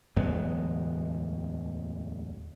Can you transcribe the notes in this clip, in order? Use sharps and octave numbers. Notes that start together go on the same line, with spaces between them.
D1 E2 G#3 B3